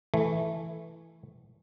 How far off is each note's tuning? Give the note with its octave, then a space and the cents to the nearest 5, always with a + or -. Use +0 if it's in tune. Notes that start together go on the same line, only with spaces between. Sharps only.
E3 +0 A3 +0